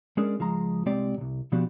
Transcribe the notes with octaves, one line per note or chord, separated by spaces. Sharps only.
G#3 C#4 D4 G#4 A#4
C#2 F3 G#3 A#5
C2 G#3 C4 G4 D5
C2 C3
B2 F3 B3 D4 F#4 G4